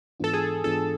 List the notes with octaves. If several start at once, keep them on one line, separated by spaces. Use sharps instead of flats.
G#2 E3 B3 D4 F4 A4
G#4
G#2 E3 B3 D4 F4 A4